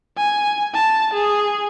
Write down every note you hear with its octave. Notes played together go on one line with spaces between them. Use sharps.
G#5
A5
G#4